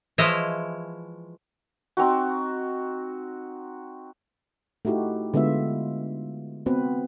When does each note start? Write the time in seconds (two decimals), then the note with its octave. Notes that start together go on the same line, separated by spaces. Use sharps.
0.18 E3 F3 G#3 E4 C#5 D#5
1.97 C4 D#4 F#4
4.85 A3 D#4 E4 F#4 G4
5.34 D3 G#3 B3 F4 E5
6.66 B3 C4 F#4 B4